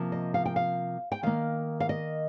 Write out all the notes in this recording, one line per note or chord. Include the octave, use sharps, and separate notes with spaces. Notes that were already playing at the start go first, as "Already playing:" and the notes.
Already playing: C3 F3 A#3
D#5
F5
G5
F5
G5
D#3 A#3 F5
F5
D#5